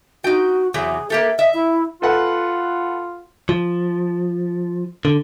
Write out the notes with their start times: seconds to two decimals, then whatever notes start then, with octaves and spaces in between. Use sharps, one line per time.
0.24 D#4 F#4 G5
0.74 E2 C3 F#3 G#4
1.10 A#3 G4 A4 E5
1.39 D#5 E5
1.54 E4
2.02 F4 A4 B4 F#5
3.49 F3
5.05 D3